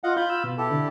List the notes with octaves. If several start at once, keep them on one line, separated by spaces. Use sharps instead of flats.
F4 D#5 F5 F#5
F4 F5 B5 G6
E6
B2
E4 G4 A4
D3